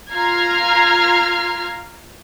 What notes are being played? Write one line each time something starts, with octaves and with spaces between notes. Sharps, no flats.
F4 A#5 F6 G#6 C7